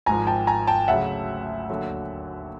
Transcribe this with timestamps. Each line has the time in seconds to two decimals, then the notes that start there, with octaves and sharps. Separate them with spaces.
0.06 G#1 G#2 F3 G#5 A#5
0.27 G5 A5
0.47 G#5 A#5
0.67 G5 A5
0.88 D2 C#3 F#3 E5 F#5
1.70 D#2 D3 F#3